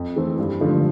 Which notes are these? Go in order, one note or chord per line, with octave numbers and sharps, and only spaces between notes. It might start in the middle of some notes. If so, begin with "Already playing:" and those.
Already playing: F2
E3 A3 C4
G2
D3 F3 A3